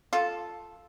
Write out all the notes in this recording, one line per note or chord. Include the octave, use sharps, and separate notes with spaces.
F4 A4